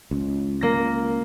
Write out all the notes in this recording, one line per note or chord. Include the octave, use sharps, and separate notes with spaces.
C#2
A#3 A#6